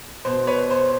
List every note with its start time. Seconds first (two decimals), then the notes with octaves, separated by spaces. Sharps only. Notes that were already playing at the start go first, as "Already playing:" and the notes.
0.25 B2 C5
0.47 B4 C#5
0.71 C5